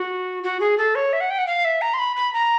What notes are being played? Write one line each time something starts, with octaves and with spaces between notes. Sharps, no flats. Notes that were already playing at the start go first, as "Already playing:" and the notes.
Already playing: F#4
F#4
G#4
A4
C#5
E5
F#5
G5
F#5
F5
E5
A#5
C6
B5
B5
A#5